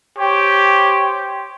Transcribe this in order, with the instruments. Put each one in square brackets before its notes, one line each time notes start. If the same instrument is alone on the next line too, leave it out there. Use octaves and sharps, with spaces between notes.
[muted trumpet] G4 [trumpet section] C5 C#5 G5